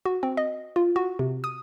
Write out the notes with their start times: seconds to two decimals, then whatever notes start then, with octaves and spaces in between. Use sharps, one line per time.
0.05 F#4
0.23 C4
0.37 D#5
0.76 F4
0.96 F#4
1.19 C3
1.44 D#6